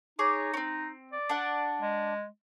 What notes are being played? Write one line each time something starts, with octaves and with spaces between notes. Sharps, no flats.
D#4 G#4 C#5 D6
C4 C#4
D5
D4 F#5
G#3